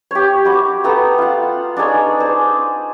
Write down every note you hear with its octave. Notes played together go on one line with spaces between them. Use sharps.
G4 C#5
F#4 B5 D6
B3 A4 G5 A#5
F4 F#5
D4 D#4 G#4 C#5
G#4 C5